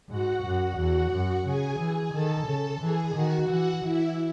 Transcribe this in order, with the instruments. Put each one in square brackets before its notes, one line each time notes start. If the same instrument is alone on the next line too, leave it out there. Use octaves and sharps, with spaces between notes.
[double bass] G#2 [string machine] F#4 F#5
[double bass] F#2
[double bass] E2 [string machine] F#4 F#5
[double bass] F#2
[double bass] C#3 [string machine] G#4 G#5
[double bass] E3
[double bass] D#3 [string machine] A4 A5
[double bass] C#3
[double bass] E3 [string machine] G#4 G#5
[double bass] D#3 [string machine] F#4 F#5
[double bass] E3
[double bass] E3 [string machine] E4 E5